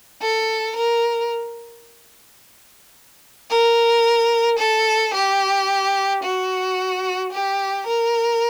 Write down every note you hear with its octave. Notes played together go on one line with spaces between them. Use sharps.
A4
A#4
A#4
A4
G4
F#4
G4
A#4